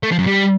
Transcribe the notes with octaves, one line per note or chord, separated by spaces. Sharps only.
A3
F3
F#2
G3